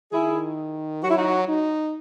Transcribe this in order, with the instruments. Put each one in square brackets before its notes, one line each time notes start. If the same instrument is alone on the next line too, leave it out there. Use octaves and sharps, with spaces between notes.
[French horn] D#3 [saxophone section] E4 G#4
[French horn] F#3 [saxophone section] F#4
[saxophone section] E4
D#4 F#4
[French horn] D#4